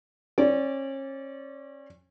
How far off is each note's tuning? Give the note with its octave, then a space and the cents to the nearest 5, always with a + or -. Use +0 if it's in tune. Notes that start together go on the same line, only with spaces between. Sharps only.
C#4 -35 D5 -20